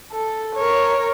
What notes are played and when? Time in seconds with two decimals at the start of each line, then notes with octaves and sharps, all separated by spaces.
0.12 A4
0.55 A#4 C#5